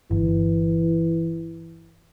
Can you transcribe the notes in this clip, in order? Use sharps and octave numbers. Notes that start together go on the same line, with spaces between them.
G1 E3